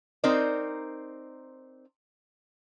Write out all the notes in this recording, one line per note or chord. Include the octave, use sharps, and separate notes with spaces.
C4 D#4 A#4 C5 D5